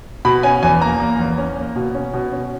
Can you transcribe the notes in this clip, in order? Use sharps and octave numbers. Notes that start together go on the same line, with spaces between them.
B2 B5
C#4 G#5
E2 G#5
A#3 A#5
A#3
E2
C#4
A#3
B2
C#4
B2
C#4